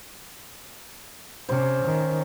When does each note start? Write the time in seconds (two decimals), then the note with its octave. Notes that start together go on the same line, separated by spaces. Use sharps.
1.49 C3 C#4 C5
1.85 D#3